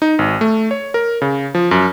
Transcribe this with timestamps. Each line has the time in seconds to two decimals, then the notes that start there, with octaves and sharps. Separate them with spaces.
0.02 D#4
0.19 G#1
0.41 A3
0.71 C#5
0.94 A#4
1.22 C#3
1.55 F3
1.71 F#2